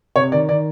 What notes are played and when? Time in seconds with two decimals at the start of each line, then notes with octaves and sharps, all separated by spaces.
0.16 C3 C#5
0.32 D#3 D5
0.49 D#3 D5